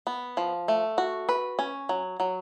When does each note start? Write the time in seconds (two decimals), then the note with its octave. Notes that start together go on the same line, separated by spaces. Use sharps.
0.07 B3
0.37 F3
0.68 A3
0.98 F#4
1.29 B4
1.59 C#4
1.89 F#3
2.20 F#3